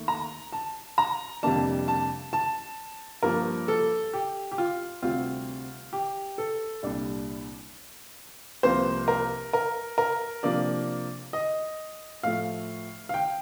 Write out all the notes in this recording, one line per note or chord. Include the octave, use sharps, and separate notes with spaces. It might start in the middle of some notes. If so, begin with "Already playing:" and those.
Already playing: D#2 D#3 A3
A#5
A5
A#5
F2 C3 G3 A#3 D4 A5
A5
A5
G2 F3 A#3 A#4
A4
G4
G4
F4
D2 C3 G3 C4 F4
G4
A4
C2 A#2 G3 D4
C2 C3 F3 A#3 C5
A#4
A#4
A#4
C3 F3 A#3 D4 D5
D#5
A2 F3 A3 F5
F5
G5